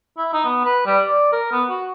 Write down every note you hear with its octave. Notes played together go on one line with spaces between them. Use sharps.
E4
D#4
B3
B4
G3
D5
A#4
B3
F#4